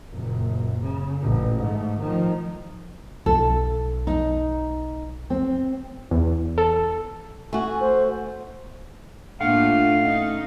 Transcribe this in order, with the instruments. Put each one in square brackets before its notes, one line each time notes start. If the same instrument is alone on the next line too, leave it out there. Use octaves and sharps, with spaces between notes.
[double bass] F#1 A#2
C#3
A1 A#2
G#2 A3
D#3 F3
[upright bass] B1 [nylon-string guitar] A4
[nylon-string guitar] D#4
C4
[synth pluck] E2
A4
[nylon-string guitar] A3 F#4 [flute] G#5
[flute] C5
[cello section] A2 A#3 F4 [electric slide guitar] A3 F#5 [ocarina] D4 [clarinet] F5
[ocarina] C#4 [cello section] D#4